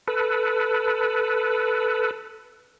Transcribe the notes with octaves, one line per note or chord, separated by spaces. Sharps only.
A4 B4